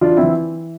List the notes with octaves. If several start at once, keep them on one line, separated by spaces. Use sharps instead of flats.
E3 D4 F4
C4 E4
E3